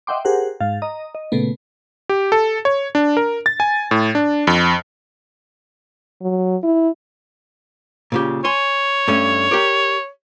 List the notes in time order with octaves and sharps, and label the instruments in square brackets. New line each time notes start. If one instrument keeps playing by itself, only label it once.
[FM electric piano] D#5 E5 F#5 G5 C6 D6
G4 G#4 A#4 C5 F#5
G#2 F5 A6
D#5 A#5 D#6
D#5
A#2 C#3 A3 B3
[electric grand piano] G4
A4
C#5
D4
A#4
A6
G#5
A2
D4
F2
[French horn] F#3
E4
[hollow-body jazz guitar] A#2 C#3 G4
[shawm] C#5 [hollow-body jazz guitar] G#5 C6
[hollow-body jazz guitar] G2 A3 C#4
G4 A#4 D5